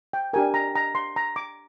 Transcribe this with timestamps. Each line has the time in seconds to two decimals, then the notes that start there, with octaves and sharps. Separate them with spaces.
0.13 G5
0.33 D4 G4 A#4 G#5
0.54 A#5
0.75 A#5
0.95 C6
1.16 A#5
1.36 D6